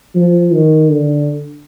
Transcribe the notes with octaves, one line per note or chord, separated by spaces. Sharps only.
F3
D#3
D3